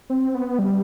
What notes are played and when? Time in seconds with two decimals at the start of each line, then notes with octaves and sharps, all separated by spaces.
0.10 C4
0.35 B3
0.59 G3